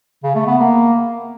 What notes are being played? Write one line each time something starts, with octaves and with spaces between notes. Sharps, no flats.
C#3
A3
B3
A#3